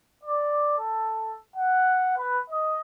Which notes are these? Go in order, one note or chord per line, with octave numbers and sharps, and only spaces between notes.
D5
A4
F#5
B4
D#5